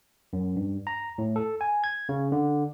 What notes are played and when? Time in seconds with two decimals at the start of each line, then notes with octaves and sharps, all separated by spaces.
0.33 F#2
0.56 G2
0.87 A#5
1.18 A2
1.36 A4
1.61 G#5
1.84 G#6
2.09 C#3
2.32 D3